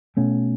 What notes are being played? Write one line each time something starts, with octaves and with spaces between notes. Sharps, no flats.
B2 A3 C#4